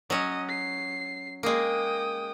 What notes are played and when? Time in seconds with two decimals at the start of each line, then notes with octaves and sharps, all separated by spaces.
0.10 F#3 C#4 D#5
0.49 C7
1.43 G#3 A#3 G5 D#6